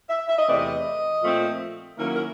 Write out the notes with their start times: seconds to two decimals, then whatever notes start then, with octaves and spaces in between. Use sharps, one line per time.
0.09 E5
0.28 E5
0.38 D#5
0.47 E2 C3 E3 A3 C4 D5
0.58 D#5
1.22 A#2 F3 A3 C4
1.97 D#3 F#3 A#3 C#4 E4 A#4
2.16 A#4